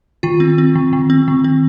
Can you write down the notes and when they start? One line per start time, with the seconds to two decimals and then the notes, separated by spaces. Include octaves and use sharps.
0.23 D#3 F4
0.40 C4
0.58 C4
0.75 D#3
0.93 D#3
1.10 C4
1.28 D#3
1.44 C4